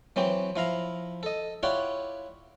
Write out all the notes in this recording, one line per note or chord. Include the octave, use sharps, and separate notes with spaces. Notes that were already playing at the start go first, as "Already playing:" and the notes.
E3 F#3 C4 G4
F3 E4 F5 A#5
A4 D#5
E4 F4 G4 C#5 D5 F#5